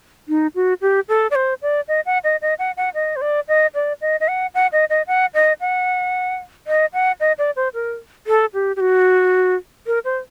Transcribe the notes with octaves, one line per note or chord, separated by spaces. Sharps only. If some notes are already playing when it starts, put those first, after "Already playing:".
D#4
F#4
G4
A4
D5
C5
D5
D#5
F#5
D#5
D#5
F#5
F#5
D#5
C5
D5
D#5
D5
D#5
D#5
F#5
F#5
D#5
D#5
F#5
D#5
F#5
D#5
F#5
D#5
D5
C5
A#4
A4
G4
G4
F#4
A#4
C5